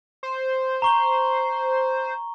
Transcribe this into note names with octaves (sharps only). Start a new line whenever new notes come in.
C5
A#5 C#6 G7